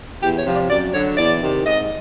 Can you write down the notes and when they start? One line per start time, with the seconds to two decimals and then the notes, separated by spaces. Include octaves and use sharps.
0.21 E2 G4
0.38 C#5
0.46 C3 F3
0.54 D5
0.69 F#2 D5
0.93 D3 F#3 C#5
1.17 E2 D5
1.41 C3 D#3
1.65 G#2 D#5